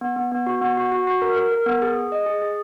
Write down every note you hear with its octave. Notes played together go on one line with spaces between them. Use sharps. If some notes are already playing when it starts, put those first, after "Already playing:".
B3
B3
B3
F#4
B3
F#4
F#4
F#4
A#4
A#4
A#4
B3
G#4
G#4
D#5
G#4
G#4